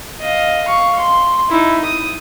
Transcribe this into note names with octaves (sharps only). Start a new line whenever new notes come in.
D#5 F5
F5 C#6
C6
D#4 E4
D#6